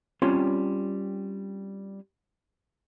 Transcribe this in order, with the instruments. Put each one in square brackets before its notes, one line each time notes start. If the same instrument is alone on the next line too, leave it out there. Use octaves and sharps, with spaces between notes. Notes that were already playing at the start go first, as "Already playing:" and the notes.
[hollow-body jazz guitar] G3 C4 C#4 F4 C#5 C6